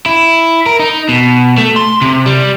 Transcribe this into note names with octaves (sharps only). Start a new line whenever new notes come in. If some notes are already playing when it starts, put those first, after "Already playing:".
E4
A#4
D#4
B2
A3
C6
C3
G3